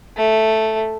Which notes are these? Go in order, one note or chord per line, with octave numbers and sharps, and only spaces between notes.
A3